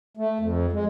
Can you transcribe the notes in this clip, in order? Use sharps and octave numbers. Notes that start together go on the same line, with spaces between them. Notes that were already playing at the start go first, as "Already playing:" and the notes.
A3
F2
G#3